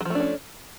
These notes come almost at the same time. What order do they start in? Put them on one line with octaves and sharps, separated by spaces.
F#3 F3 A3 D4 C#4